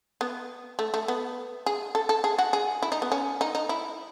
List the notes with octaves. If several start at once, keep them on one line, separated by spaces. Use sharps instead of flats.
B3
A3
A3
B3
G#4
A4
A4
G#4
F#4
G#4
E4
D#4
B3
C#4
D#4
D#4
E4